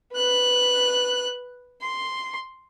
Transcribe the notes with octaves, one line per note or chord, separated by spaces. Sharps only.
B4 F#6
C6